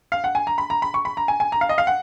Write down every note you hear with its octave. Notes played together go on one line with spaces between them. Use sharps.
F5
F#5
G#5
A#5
B5
A#5
B5
C#6
B5
A#5
G#5
G#5
A#5
F5
D#5
F5
F#5